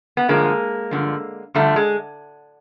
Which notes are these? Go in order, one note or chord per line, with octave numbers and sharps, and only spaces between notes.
B3
G2 D3 F3 G#3 A#3
G2 D3 F3
G2 D3 F3 G3 A3
G#3